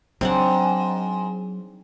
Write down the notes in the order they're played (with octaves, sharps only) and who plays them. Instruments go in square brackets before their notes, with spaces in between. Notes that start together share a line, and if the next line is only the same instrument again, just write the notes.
[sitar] G#2 [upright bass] F#3 [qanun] C4 D4 F#5